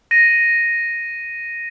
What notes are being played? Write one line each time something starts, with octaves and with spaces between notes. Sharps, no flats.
A#6 D#7